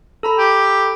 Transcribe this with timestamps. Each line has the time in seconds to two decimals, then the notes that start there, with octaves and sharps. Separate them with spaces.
0.23 A4 A#5 B5
0.39 G4